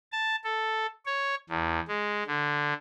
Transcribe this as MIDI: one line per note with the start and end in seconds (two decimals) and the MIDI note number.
0.12 0.36 81
0.44 0.86 69
1.06 1.35 73
1.49 1.80 40
1.88 2.23 56
2.27 2.73 50